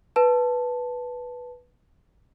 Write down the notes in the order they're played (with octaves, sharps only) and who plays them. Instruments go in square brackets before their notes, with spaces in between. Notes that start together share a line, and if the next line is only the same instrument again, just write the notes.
[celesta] B4 A5